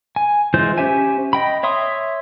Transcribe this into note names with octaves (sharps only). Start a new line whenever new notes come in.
G#5
E3 G#3 F4 C5 G6
C#4 G4 C5 E5 G#5
D#5 G5 B5
C#5 E5 C6 D#6